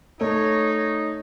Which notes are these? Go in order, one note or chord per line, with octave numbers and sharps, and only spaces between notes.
A3 D#4 C#5